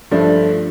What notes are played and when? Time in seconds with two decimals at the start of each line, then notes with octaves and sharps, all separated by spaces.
0.11 G2 F3 A3 D4